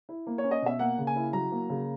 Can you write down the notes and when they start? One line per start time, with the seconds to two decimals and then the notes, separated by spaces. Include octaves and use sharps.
0.09 E4
0.27 A#3
0.38 C#5
0.44 C#4
0.51 D#5
0.62 B2 E5
0.79 A#3 F#5
0.98 C#3
1.07 G#5
1.16 E4
1.33 F#3 A#5
1.52 A#3
1.70 C#3